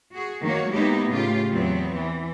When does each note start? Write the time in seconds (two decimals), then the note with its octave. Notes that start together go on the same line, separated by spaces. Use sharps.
0.14 F#4 G#4
0.44 D#3 A#3 F#4 C#5
0.72 G#3 A#3 B3 D#4 E4 G4
1.09 A2 C#3 F4 G4
1.54 E2 F#3 B3 C4
1.98 E3